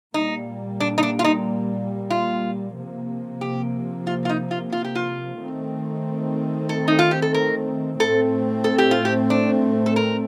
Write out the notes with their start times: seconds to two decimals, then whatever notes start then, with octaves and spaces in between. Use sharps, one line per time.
0.14 A#2 G3 A#3 D#4
0.80 D4
0.98 D#4
1.03 D4
1.19 F4
1.24 D#4
2.10 F4
2.77 C3 F3 A#3
3.41 G4
4.07 F4
4.25 F4
4.29 D#4
4.51 F4
4.72 F4
4.85 G4
4.95 F4
5.38 D#3 A3 C4
6.69 A4
6.88 D#4
6.99 F4
7.11 G4
7.22 A4
7.34 A#4
7.99 A2 A3 C4 A4
8.64 A4
8.78 G4
8.91 F4
9.05 G4
9.30 D4
9.86 A4
9.96 A#4